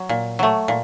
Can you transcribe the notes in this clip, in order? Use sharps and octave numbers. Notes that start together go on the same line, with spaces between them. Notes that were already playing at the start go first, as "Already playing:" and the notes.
Already playing: F#3
A#2
F#3 A3
A#2